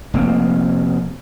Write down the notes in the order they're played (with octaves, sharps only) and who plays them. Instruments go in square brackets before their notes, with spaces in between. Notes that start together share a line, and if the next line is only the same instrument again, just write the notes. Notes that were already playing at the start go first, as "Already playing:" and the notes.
[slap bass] F1 A#3 C4